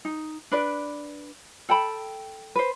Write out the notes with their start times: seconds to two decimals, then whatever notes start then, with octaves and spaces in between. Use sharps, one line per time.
0.05 D#4
0.51 D4 B4 D5
1.69 A4 G5 A5 B5
2.56 B4 C5